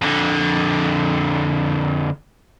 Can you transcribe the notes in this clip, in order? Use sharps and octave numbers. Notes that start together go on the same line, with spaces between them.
F2 D3